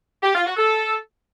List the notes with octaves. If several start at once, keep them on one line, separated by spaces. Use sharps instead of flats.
G4
F4
F#4
A4